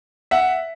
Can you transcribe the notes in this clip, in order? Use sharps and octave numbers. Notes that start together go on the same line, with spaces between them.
E5 F#5